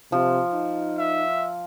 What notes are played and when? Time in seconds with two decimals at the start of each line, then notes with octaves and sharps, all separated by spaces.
0.12 C3 F3
0.52 D#4
0.98 E5